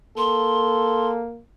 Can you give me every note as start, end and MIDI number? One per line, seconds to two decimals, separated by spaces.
0.18 1.42 58
0.18 1.22 69
0.18 1.10 84